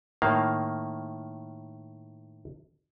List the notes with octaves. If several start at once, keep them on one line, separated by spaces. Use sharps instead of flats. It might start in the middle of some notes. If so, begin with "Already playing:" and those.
A2 D#3 A#3 F5